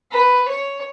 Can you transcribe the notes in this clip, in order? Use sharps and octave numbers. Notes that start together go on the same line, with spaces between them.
B4
C#5